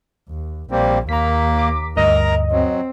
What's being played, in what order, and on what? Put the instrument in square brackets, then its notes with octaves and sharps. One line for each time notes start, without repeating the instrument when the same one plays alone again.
[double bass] D#2
[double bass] A#1 [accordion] G3 A#3 C4
[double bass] D#2 [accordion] A#3 [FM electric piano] A#5 B6
[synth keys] D6
[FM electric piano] D2 G2 [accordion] A#4 A#5 [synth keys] D#5
[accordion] F#3 [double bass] C4